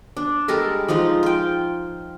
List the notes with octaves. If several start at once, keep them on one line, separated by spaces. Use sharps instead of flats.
D4
G3 G#3 A4 A#4
F3 G#3 D#4 F4
F4 G5